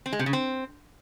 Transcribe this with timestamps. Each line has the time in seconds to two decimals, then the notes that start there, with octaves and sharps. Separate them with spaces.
0.06 C4
0.13 G#3
0.19 C3
0.26 C#3
0.33 C4